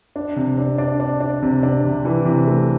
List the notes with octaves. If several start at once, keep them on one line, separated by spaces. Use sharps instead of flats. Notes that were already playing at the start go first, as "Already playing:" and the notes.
D4
C3
D4
D4
D4
D4
C3
D4
C3
E3
C3
A3